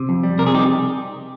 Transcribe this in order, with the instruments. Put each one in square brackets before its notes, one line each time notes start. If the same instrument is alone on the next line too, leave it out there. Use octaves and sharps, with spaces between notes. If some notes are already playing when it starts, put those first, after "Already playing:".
Already playing: [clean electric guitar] C3
F2
G3
C3 A#4
G#4
D#4 G4